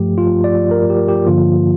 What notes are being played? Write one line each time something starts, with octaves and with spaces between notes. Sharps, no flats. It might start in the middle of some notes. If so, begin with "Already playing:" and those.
Already playing: G2 F3 A3 G4
F4
D5
A#4
G4
G4
G2 D3 F3 A#3 F4